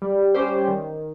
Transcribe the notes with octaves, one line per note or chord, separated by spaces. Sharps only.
G3
C#4 G4 C5
D#3